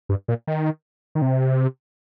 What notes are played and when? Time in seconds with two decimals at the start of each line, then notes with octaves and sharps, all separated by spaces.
0.09 G2
0.28 A#2
0.47 D#3
1.15 D#3
1.22 C3